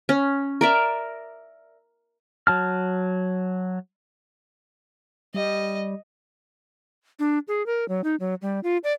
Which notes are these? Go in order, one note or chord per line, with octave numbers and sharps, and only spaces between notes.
C#4
A#4 D5 E5
F#3 A5 F6
G3 D#5
D4
G#4
A#4
F#3
D#4
F#3
G3
F4
D5